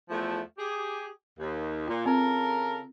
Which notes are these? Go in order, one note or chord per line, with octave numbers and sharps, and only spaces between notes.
E2 F3 A3
G4 G#4
D#2
A#2 F4
C#3 C4 A4 A#4